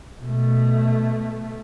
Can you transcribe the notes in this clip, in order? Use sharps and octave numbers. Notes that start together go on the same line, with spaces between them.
B2 A3